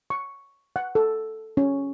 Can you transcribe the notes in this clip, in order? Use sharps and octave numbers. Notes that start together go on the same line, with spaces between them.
C#6
F#5
A4
C#4